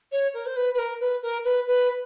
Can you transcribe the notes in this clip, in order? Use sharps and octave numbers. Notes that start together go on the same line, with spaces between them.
C#5
A#4
C5
B4
B4
A#4
B4
A#4
B4
B4